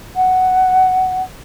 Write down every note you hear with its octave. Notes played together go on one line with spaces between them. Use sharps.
F#5